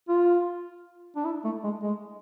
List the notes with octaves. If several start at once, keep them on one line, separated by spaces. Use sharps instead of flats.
F4
D4
E4
A3
G#3
G#3